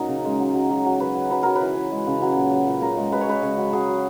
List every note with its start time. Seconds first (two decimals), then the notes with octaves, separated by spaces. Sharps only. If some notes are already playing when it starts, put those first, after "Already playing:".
Already playing: A#2 F#3 C#4 D#4 A#4
0.09 C#3
0.25 G#3
0.40 F#3
0.54 F#3
0.70 F#3
0.86 F#3
1.00 F#3 B4
1.15 F#3
1.31 F#3 B4
1.43 F#3 A#4
1.55 B4
1.61 E3
1.76 E3
1.92 G#3
2.07 C#3
2.22 F#3
2.36 A#2
2.52 F#3
2.67 A#2
2.81 C#3 A#4
2.97 G#3
3.12 G#3 B4
3.21 C#5
3.27 G#3 B4
3.42 C#3 C#5
3.57 F#3
3.73 F#3 G#4
3.89 F#3